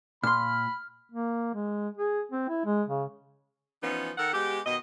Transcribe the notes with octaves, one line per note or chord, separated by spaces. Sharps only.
A#2 B5 C6 F6
A#3
G#3
G#4
C4
E4
G#3
C#3
E3 F3 B3 C#4 D#4
D#3 A4 A#4 F#5
G#3 B3 G4
B2 D#3 D#5